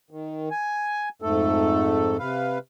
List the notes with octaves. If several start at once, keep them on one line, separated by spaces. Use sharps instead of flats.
D#3
G#5
F2 G#2 A3 A4
C3 B4 F5